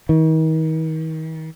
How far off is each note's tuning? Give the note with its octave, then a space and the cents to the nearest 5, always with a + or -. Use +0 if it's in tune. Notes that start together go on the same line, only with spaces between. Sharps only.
D#3 +40